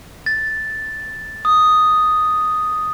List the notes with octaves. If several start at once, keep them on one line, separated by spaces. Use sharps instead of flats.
A6
D#6